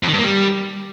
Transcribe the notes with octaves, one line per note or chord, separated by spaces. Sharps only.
F2
D#3
G2
A#3
G3